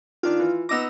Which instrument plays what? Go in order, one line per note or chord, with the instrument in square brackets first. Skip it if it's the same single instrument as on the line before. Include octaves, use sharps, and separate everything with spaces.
[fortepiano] D#3 D4 [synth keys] F4
[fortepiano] E3
[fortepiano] B3 D#4 D6 [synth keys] E6 A#6